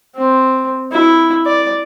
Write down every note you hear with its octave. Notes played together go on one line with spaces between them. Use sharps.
C4
E4
D5